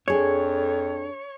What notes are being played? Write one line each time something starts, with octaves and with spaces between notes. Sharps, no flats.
F2 D4 G#4 A4 C#5